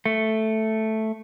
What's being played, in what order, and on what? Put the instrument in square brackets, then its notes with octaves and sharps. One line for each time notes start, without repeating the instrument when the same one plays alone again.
[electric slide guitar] A3